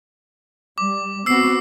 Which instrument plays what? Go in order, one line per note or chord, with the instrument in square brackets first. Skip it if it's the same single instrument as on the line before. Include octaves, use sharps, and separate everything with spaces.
[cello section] G3 [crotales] D6
[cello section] B3 C4 F#4 [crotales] E6 C7